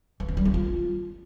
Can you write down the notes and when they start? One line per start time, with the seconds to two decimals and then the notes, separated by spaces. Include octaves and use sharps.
0.20 E3
0.28 C#4
0.37 G3
0.45 C#4
0.54 F4